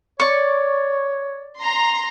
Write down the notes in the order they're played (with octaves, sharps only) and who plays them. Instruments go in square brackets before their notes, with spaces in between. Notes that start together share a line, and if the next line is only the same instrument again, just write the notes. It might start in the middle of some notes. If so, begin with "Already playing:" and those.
[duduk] C#5 [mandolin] D5 C#6
[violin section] A#5 C6